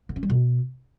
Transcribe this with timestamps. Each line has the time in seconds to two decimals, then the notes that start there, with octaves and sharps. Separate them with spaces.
0.09 D3
0.16 C#4
0.23 G3
0.30 B2